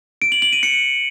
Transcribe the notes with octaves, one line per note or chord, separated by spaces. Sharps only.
D7
F#7
F#7
D#7
C#7